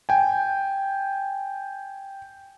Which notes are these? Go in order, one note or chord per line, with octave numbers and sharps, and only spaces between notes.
G5 G#5